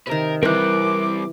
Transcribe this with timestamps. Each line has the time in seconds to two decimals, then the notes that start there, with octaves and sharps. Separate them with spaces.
0.07 C3 D#3 A#4 B4
0.43 E3 G3 C4 A#4 G5 D6 F#6